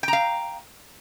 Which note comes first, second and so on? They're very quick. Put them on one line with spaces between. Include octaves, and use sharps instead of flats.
G5 A#5 F5